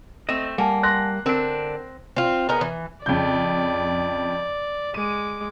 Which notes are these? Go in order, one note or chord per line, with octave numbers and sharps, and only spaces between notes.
A3 C4 D#5 E7
G3 A#3 F#5 G#5 A5
C6 F#6 A#6
D3 C4 D4 A#4
C4 F4
B3 D#4 G#4 A#4
E3
F2 C#3 D5 G6
G#3 D6 D#7